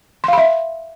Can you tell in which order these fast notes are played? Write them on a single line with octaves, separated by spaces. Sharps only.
C6 F5 B5 E5